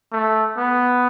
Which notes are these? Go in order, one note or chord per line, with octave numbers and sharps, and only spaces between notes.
A3
B3